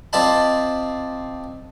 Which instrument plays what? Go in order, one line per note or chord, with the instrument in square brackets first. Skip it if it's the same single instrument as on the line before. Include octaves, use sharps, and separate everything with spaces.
[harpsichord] C4 F4 D5 D#5 A5 B5